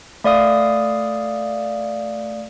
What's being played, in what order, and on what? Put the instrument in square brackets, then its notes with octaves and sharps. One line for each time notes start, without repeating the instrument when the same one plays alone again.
[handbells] A3 D5 F5 D#6